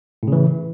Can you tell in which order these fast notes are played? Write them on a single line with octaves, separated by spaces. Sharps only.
A2 C#3 E3